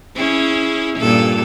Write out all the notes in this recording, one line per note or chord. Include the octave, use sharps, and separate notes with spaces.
C#4 E4 G#4
G2 A#2 A4